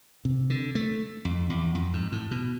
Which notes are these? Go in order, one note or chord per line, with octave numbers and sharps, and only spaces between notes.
C3
D3
A3
F2
E2
F2
G#2
A2
B2